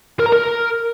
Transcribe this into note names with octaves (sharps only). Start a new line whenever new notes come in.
A#4
A#5
A#4